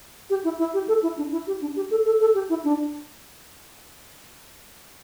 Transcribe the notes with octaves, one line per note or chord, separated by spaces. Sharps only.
G4
E4
E4
G4
A4
E4
D4
E4
G4
D4
G4
A4
A4
A4
G4
E4
D4